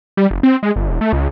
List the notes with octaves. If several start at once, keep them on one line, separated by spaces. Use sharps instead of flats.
G3
F#1
C4
G#3
G1
E1
A3
C#2